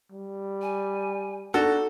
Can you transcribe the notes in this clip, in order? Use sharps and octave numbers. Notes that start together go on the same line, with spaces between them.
G3
G#5
D4 D#4 F#4 A4